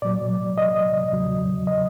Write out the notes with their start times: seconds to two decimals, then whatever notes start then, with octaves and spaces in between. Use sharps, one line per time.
0.02 A#2 F#3 D5
0.58 D#5
1.12 E2 C#3 F#3
1.67 D#5